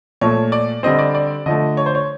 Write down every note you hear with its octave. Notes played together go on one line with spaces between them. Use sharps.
A#2 F3 A3 C#5
D5
D3 G3 C4 D#5
D5
D5
D3 F3 A3 D#5
C#5
C5
C#5